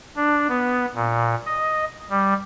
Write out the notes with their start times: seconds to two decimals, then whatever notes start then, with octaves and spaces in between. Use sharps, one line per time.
0.16 D4
0.49 B3
0.95 A#2
1.46 D#5
2.10 G3